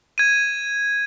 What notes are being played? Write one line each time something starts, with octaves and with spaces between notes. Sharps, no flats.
G#6 D#7